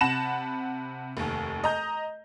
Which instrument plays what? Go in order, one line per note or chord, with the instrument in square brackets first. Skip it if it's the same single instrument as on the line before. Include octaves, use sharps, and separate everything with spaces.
[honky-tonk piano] C3 F#5 A5 B5 A#6 E7
F1 D#2
D#5 A#5 G6